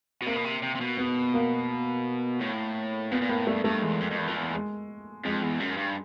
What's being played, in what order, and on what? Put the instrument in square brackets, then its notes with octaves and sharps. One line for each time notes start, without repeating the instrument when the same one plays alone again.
[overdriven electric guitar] B2
[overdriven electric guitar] C3 [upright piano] A#3
[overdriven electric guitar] B2
C3
C3
C3
B2
[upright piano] B3
A#3
[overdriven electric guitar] A2
[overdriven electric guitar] A#2 [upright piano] B3
[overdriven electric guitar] A#2
[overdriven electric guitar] A2 [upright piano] A#3
[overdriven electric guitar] G2 [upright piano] A3
[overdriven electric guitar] G2 [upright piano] A3
[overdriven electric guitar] E2 [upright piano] G#3
[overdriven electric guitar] F2
F2
E2
F2
E2
[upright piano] G#3
[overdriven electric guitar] F2 [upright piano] G#3
[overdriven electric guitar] E2
F#2
G2